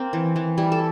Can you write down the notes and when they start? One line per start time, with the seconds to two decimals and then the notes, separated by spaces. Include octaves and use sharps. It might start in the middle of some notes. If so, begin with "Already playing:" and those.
Already playing: A#3 C4
0.13 E3
0.36 E3
0.58 G3 E4
0.72 A4